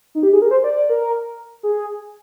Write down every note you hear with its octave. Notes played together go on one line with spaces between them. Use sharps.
D#4
G4
G#4
A#4
C5
D5
D5
A#4
G#4